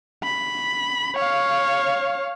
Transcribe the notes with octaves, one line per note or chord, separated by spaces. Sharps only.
B5
C#5 F5